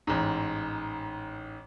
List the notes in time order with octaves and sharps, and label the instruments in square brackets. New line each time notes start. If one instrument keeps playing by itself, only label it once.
[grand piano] A1 G#2